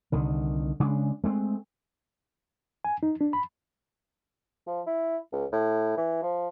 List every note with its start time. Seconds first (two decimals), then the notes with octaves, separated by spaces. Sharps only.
0.12 C2 D3 D#3
0.80 C#3 G#3 D4
1.24 G#3 A3 C4
2.85 G#5
3.03 D#4
3.21 D4
3.33 B5
4.67 F3
4.87 E4
5.32 C#2
5.52 A2
5.97 E3
6.22 F3